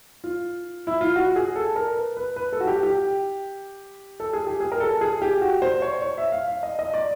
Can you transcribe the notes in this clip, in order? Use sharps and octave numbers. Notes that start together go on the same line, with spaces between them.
F4
E4
F4
F#4
G#4
A4
A#4
B4
B4
B4
A4
F#4
G4
G4
A4
G#4
G4
G#4
A#4
A4
G#4
G4
F#4
C5
C#5
C#5
E5
F5
F5
D#5
D#5
D5